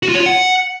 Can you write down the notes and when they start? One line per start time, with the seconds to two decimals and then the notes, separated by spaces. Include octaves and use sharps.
0.03 F#4
0.09 F4
0.14 C#5
0.20 F4
0.26 F#5